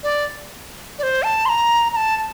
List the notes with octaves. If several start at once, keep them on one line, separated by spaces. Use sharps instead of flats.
D5
D5
C5
A5
C6
A#5
A#5
A5
A5